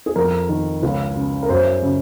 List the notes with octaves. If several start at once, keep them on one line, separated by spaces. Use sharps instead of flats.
G#4
F2 A#4
D#3
C#2
C#3
A#4
F#2 C5
C#3